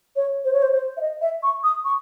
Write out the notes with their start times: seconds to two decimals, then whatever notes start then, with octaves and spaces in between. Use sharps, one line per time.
0.16 C#5
0.45 C5
0.53 C#5
0.62 C5
0.73 C5
0.97 E5
1.01 D#5
1.21 E5
1.43 C#6
1.64 D#6
1.85 C#6